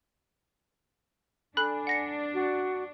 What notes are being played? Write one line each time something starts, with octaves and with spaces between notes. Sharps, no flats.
D4 A4 G#5 B5 F#6
F#5 A#6 C#7
F#4